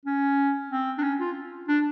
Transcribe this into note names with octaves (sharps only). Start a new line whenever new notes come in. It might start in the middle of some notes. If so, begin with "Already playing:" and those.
C#4
C4
D4
C#4
F4
D4